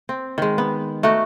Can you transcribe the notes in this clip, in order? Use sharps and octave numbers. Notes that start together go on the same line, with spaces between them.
C4
D#3 G#3
B3
A3 D#4 F#4